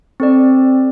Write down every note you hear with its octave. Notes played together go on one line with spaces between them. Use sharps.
C4 A4 D5